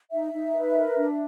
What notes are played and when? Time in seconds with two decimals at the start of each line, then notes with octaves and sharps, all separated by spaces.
0.11 D#4 E5
0.33 D#4
0.54 B4
0.75 A#4
0.97 D4